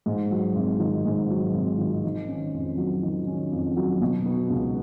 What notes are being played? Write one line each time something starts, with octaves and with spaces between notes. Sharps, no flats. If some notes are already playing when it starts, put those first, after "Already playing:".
G#2
F#3
G#1
D#3
G#2
F#3
G#1
D#3
D#3
C#4
F2
F#3
D#3
C#4
F2
F#3
B2
B3
C#2